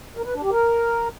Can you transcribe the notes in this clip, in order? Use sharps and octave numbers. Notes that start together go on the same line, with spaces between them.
A#4
B4
D4
G4
A#4